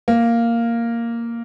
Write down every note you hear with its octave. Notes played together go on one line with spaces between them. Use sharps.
A#3